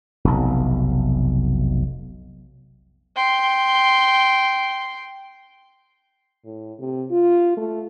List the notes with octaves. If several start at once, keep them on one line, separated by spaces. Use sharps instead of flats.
F1 B1
G5 C6
A2
C3
F4
A3